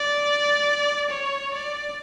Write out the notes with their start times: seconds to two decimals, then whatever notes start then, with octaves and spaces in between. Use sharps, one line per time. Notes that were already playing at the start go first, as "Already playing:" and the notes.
Already playing: D5
1.10 C#5
1.54 D5